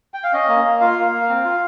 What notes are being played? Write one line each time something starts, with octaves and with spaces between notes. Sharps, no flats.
G5
F5
C#4 D#5
A#3
A#3
F4 F5
A#3
A#3
C4
F4